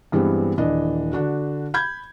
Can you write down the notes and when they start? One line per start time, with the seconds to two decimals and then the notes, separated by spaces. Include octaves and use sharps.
0.12 G2 E3 G3 G#3 B3 C4
0.58 D#1 E3 D4 D#5
1.13 D3 D4 F#4
1.74 B5 G6 G#6